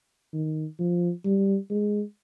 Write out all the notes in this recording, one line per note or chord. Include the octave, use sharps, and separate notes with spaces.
D#3
F3
G3
G#3